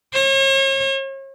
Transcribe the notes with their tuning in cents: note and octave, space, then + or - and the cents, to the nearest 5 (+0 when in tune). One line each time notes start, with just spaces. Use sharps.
C#5 -40